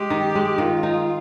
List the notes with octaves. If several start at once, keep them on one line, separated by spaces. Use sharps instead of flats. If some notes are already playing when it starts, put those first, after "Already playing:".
Already playing: G#3 G4
D#3
G#3
D#3 F4
D#4